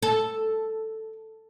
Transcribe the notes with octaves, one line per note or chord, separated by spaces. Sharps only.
A4